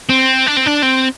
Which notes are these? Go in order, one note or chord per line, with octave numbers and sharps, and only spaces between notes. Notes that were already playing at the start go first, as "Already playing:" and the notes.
C4
D4
C4
D4
C4